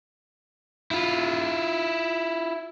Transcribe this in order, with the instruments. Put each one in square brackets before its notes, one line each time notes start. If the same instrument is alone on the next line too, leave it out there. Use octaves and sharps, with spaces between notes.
[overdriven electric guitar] E4 F4